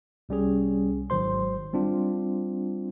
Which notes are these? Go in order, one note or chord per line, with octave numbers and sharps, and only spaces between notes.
C2 G3 C#4 G#4
G#1 D#3 F#3 C5 C6
G3 C4 D4 F4